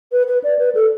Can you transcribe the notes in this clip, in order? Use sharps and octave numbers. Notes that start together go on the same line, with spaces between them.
B4
B4
D5
B4
A4